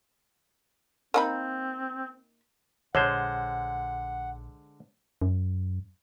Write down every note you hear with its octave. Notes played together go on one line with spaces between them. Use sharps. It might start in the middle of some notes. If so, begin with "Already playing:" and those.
A#3 C4 D#4 B5
A#1 D3 G#3 C5 C#5 F#5
F#2